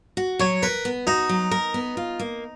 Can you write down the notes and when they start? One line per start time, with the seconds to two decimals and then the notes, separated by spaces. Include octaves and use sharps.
0.17 F#4
0.39 F#3 C#5
0.63 A#4 B4
0.85 B3
1.07 D#4 F#4
1.29 F#3
1.51 A#4
1.74 B3
1.97 F4
2.19 A#3